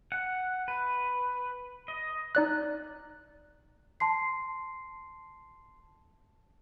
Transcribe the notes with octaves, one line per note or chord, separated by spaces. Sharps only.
F#5
B4
D#5
D#4 D5 F#6
A5 C6 C7